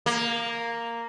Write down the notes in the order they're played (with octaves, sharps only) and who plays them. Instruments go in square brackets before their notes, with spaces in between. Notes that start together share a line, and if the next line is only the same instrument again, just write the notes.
[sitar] A#3